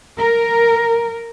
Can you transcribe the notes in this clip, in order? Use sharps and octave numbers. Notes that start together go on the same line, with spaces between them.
A#4